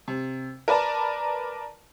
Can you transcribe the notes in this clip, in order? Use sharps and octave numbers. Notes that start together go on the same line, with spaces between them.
C3
A#4 B4 D5 A5 A#5